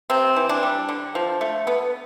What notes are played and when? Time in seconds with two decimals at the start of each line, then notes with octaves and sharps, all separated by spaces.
0.10 C3 C4
0.36 E3
0.49 D4
0.63 G3
0.89 D3
1.15 F3
1.41 A3
1.67 B3